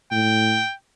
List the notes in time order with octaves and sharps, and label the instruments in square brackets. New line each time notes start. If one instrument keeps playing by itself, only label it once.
[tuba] A2 [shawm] G5